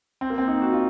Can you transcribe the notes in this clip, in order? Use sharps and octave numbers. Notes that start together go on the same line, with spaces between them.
C4
A#3
C4
D#4
F#4
F4